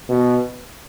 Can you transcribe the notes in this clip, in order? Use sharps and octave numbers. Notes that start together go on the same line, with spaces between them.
B2